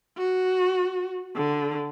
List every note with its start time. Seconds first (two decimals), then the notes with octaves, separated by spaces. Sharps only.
0.17 F#4
1.36 D3